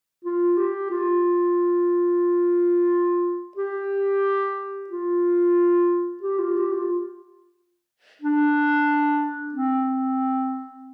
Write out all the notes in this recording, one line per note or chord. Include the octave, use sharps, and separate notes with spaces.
F4
G4
F4
G4
F4
G4
F4
G4
F4
D4
C4